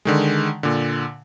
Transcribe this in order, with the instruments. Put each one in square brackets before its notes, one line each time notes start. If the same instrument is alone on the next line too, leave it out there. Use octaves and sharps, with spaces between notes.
[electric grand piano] D3 D#3 G#3
A#2 D3